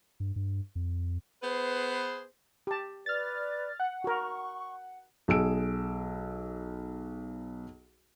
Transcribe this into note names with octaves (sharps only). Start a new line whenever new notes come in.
G2
G2
F2
B3 G#4 B4 C5
G4 A5
B4 D5 F6 A6
F#5
F#4 A#4 C#6
B1 G#4 E6 D7